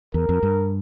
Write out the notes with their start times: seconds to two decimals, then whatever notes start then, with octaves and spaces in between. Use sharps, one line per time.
0.14 E2 A#4
0.29 F2
0.43 G2